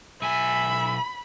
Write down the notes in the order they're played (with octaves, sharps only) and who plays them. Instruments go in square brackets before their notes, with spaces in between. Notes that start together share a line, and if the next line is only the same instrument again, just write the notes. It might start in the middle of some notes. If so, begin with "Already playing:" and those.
[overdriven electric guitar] B1 G#5 [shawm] E5 [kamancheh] B5